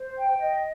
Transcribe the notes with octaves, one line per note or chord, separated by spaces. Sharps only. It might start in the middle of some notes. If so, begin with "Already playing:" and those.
Already playing: C5
G5
D#5